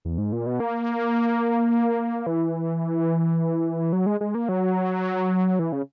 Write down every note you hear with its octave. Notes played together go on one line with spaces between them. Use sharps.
E2
G#2
A#2
B2
A#3
E3
F#3
G#3
G#3
A#3
F#3
E3
C#3